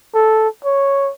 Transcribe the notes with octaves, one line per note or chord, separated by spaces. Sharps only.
A4
C#5